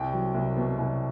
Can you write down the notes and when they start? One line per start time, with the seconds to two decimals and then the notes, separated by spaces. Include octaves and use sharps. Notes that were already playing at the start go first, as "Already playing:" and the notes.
Already playing: C2 G5
0.13 F#3
0.34 C2
0.56 B2
0.78 C2